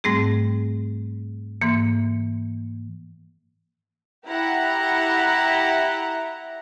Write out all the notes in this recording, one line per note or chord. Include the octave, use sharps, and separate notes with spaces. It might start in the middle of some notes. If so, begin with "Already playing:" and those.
G#2 G3 A3 C4 G#4
G#2 E3 A#3
E4 G4 F#5 A#5